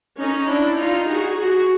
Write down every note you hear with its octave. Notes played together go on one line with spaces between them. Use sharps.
C#4 D#4
D4 E4
D#4 F4
F#4 G#4
F#4 G#4